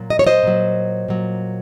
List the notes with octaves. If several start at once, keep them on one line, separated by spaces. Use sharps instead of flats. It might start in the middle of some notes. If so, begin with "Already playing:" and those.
Already playing: A#2 F#3
D#5
C#5
C5 D#5
A#2 F#3
A#2 F#3